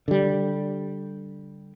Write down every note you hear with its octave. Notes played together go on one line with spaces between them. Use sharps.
D3 G3